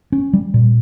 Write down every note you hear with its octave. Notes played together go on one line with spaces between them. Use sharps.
C#4
G3
A#2